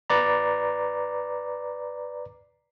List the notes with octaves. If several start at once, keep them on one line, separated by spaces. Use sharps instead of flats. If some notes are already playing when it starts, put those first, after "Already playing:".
B4 D5 A#5